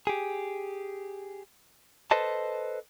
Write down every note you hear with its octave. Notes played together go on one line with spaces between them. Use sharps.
G4 G#4
A4 B4 C5 D#5 A5